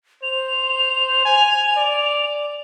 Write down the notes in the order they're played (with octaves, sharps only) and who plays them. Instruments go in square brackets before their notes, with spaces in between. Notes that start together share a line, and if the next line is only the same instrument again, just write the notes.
[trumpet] C5 [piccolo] F7
[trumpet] G#5
D5